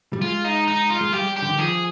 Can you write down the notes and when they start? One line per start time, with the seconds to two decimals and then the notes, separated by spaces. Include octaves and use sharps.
0.13 G3
0.22 G#3 F4
0.44 D#4
0.67 D#4
0.90 F4
1.01 G#3
1.13 G3 G4
1.36 G4
1.42 D3
1.50 D#3
1.58 F3 G#4